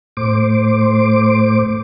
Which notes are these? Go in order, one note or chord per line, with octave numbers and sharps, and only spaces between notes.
A2 C5 D6